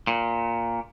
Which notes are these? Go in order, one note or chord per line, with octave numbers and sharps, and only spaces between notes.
A#2